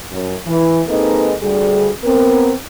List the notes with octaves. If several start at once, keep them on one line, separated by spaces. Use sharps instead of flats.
F#2
E3
G#3 A#3 C4 D#4 A4 B4
D2 G3 G#4
B3 C4 A#4